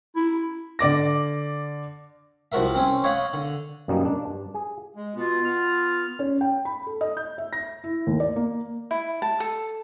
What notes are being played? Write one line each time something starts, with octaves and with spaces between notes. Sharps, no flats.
E4
D3 D5 D6 A#6
C2 F3 F#4 A#4 E5
C4 C#4
C#5 D#5 F5 F#5 B5
D3
F#2 B2 G3 A#3 C#4 D#4
D4
G2
G#4
G#3
B2 B3 F4
B3 F6
C#4
G5
B5
A4
D#5
G6
E5
A#6
E4
D#2
D5
A#3
E4
A5
A4